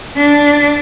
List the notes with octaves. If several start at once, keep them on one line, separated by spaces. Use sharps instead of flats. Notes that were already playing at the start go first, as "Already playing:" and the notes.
D4